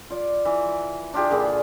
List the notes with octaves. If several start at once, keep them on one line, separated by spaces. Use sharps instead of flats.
F4 D5
E3
D4 F4 G4 G#4
A#2 D3 G#4 B5